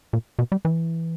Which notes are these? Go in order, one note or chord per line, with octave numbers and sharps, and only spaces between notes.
A#2
B2
G3
E3